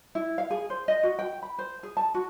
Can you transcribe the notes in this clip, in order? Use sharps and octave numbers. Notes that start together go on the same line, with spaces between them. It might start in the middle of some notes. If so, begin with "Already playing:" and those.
E4
F5
G#4
C5
D#5
F#4
G5
B5
C5
G#4
A5
F#4